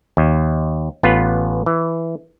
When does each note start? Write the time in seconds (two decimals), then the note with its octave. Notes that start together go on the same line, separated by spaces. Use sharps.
0.17 D#2
1.03 A1 B3 F4 B4
1.66 E3